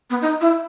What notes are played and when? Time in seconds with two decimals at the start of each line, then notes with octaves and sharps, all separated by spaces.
0.10 B3
0.22 D#4
0.41 E4